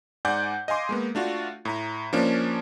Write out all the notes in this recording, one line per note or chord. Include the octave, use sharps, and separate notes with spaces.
G#2 D5 F#5 G#5 D6 G6
D#5 F5 G#5 C6 D6
G#3 A#3 B3
A3 D4 F4 F#4
A2 A#5
F3 A#3 C#4 D4